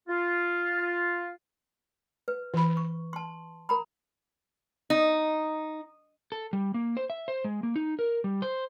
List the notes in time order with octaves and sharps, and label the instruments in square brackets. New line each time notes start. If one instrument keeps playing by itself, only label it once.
[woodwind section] F4
[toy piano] B4
[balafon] E3 B5
[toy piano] C#6
A5 C6
A#4 A#5 B5
[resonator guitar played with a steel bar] D#4
[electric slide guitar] A4
G3
A#3
C5
E5
C5
G#3
A#3
D#4
A#4
G3
C5